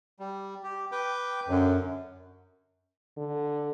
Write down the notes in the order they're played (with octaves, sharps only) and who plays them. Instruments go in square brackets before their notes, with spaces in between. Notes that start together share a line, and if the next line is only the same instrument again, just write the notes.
[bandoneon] G3
G4
B4 G5 D6
[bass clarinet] F#2 [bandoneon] D3 F#3
[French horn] D3